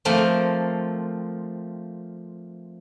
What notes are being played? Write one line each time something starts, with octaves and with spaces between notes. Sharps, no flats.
F3 A3 A#3 C4